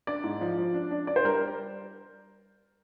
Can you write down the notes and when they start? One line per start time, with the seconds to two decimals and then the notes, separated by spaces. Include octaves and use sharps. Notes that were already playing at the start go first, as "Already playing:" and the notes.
0.07 D4 D5
0.24 G#2
0.41 F3
0.58 F3
0.74 D4
0.91 D4
1.07 D4 D5
1.16 C5
1.24 G3 A#4